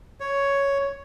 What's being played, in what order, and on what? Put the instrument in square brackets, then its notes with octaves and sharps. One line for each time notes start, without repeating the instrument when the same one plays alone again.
[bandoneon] C#5